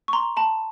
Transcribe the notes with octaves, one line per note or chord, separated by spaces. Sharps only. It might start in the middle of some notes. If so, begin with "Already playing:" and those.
C#6
A#5 C6
A5 B5